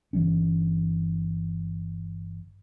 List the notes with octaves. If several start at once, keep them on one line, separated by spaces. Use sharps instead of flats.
G1 E3 F#3 C#4